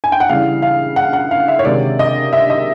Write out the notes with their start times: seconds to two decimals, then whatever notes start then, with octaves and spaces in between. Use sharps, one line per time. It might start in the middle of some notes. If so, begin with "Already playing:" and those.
0.04 G#5
0.12 G5
0.20 F#5
0.29 C#3 E3 G3 F5
0.62 F5
0.96 F#5
1.13 F#5
1.31 F5
1.48 E5
1.59 C#5
1.65 C3 D#3 G#3 D5
1.99 D#5
2.33 E5
2.50 D#5